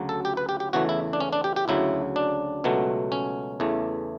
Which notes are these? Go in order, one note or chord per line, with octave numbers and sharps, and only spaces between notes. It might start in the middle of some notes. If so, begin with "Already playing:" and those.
Already playing: D2 C#3 F#3
A4
G4
B4
G4
G4
E2 C#3 E3 A3 F#4
E4
D4
C#4
D4
G4
G4
D2 C#3 F#3 E4
D4
C#2 B2 F#3 A3
C#4
E2 C#3 E3 A3